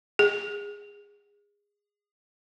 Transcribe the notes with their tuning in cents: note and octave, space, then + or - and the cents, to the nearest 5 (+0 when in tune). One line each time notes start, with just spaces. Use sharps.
G#4 -20